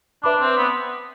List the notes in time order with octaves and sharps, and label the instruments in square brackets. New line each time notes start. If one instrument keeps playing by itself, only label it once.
[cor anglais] D4 [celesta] B4 E5 B5 D6
[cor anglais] C4
B3